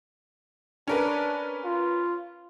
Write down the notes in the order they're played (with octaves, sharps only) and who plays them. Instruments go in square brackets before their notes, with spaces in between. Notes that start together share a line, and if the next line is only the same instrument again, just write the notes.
[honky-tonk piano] C#4 A#4 B4 [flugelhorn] D4
[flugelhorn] F4